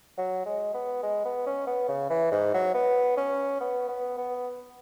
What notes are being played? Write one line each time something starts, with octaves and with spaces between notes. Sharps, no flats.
F#3
G#3
B3
G#3
B3
C#4
B3
C#3
E3
G#2
F#3
B3
C#4
B3
B3
B3